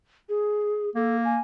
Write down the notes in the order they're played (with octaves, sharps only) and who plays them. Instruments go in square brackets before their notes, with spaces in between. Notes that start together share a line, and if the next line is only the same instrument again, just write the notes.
[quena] G#4
[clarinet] A#3 [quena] A4
[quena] G#5